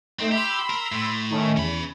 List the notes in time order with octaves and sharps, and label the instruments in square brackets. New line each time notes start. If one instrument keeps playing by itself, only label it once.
[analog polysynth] A3 D#4 [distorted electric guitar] C4
[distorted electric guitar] G4 [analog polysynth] B5 C6 E6
[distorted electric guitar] A#4
A2
[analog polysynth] D#3 A3 C#4
[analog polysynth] E2 [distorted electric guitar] C#4 B5